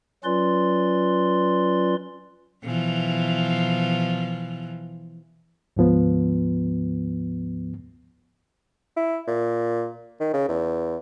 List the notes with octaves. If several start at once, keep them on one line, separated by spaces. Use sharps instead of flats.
F#3 C#4 F4 B4 D5 C6
B2 E3 F3
D2 G#2 F3 B3
E4
A#2
D#3
C#3
E2